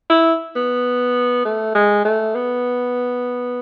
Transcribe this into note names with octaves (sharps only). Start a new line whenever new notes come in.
E4
B3
A3
G#3
A3
B3